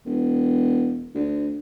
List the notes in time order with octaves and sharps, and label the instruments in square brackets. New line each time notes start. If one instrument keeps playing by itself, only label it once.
[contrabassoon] E1
D2